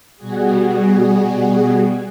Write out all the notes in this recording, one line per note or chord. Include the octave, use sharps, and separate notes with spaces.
B2 G3 F#4 G#4